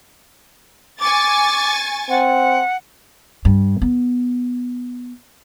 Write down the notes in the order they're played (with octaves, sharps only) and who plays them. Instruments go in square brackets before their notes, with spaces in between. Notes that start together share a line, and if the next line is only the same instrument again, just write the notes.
[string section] G#5 C#6 A6 [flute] D6
[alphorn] C4 [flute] F#5
[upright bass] G2
B3